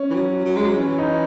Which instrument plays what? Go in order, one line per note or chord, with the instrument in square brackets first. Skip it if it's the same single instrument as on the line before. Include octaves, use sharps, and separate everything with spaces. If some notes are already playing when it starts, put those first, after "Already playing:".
Already playing: [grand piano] C#4
[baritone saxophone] E3
F#3
F#3
G#3
F#3
[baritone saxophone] E3 [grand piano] C#4
[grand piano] D#4